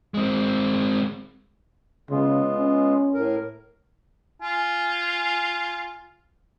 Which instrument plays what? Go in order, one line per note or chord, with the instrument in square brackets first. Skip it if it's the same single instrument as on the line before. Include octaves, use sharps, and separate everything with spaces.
[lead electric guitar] G#3 C4
[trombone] C#3 [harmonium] G#3 B3 F4
[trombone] C#4
[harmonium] A2 A#4
[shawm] F4 [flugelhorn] G#5